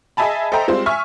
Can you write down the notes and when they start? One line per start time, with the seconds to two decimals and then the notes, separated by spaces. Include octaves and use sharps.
0.17 G#4 D#5 E5 G#5 A5 B5
0.52 A4 C5 D#5 E5 G5 A#5
0.68 G3 G#3 C4 F4 C5
0.86 E5 G#5 C#6 F6